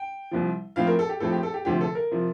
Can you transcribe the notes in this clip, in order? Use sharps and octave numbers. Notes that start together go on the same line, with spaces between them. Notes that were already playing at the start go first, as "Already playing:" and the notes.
Already playing: G5
C2 C3 F3
A2 F3 C4 F5
A#4
A4
G4
A2 F3 C4 A4
G4
A4
G4
D2 C3 F3 G4
A4
A#4
C3 F3